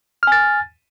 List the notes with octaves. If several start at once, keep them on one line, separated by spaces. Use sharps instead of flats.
G#5 F6 A6